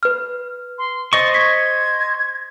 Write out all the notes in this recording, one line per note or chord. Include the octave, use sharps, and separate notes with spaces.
B4 F6
C6
C5 D#5 C#6 A6
G#6 B6